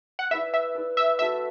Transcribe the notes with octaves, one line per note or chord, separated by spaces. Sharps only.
F#5
E4 B4 D5 E5
E5
E4 B4 D5
E5
A3 F#4 A4 E5